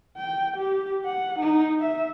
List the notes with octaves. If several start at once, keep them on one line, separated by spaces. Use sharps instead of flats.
G5
G4
F#5
D#4
E5